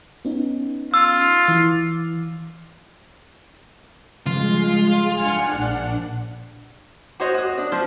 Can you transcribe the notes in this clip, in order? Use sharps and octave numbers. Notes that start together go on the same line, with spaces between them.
B3 C#4 D#4
F4 E6
E3 D6
C#3 F3 G3 G#3 F4
D4 F#5 G#5 F6 C#7
A#1
F#4 C5 C#5 D#5
F#4 D#6
D4
F3 C5